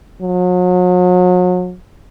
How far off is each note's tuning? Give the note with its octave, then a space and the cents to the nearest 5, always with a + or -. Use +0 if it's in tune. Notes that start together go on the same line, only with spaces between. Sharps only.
F#3 -40